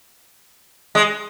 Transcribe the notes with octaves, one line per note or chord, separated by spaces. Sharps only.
G#3